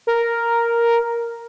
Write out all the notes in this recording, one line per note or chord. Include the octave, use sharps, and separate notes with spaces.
A#4